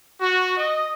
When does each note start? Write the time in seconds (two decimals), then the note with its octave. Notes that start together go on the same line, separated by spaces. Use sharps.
0.21 F#4
0.58 D#5